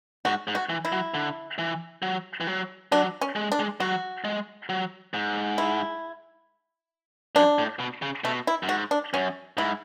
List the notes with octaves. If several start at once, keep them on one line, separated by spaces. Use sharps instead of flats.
G#2 F#4
G#2
F#4
E3
E4
F#3
D3
E3
F#3
E3
F#3
F#3 D4
C#4
G#3
D4
G#3
F#3 F#4
G#3
F#3
G#2
E4
F#2 D4
A2
B2
C#3
B2 A3
E4
F#2
G#2 F#4
D4
F#2 C#4
G#2 E4